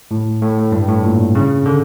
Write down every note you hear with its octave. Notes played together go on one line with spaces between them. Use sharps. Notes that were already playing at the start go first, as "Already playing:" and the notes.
A2
A2
A2
G2
A2
A#2
C#3
D3